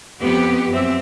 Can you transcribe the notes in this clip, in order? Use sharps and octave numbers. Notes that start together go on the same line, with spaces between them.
F2 B3 G4
F#2 C4 E5